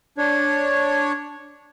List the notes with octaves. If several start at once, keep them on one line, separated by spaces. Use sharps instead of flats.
D4 C#5